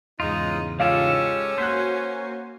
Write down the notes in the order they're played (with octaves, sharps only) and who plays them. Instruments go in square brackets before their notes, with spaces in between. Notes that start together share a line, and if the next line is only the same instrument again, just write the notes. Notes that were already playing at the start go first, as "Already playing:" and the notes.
[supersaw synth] E2 G#2 C#3 [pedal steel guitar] G#3 F4 [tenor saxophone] D#4
[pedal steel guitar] G#3 G4 A4 [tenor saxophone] C#4 [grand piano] F4 F5
[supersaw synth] A#3 F#4 G#5 [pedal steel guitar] C5 [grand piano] F#6 B6